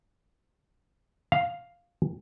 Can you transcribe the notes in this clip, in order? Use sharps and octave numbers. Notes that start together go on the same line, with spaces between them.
F5